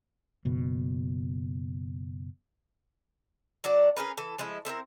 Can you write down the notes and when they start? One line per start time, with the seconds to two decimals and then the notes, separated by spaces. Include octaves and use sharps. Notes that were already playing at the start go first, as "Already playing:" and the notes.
0.45 F#1 B2
3.64 F#3 D4 F#4 D5
3.96 C#4 G#4 A#4 B4
4.17 E3 A4
4.38 F3 G#3 A3 E4
4.65 A3 C4 E4 A#4